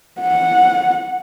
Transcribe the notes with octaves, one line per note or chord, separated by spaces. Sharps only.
F#5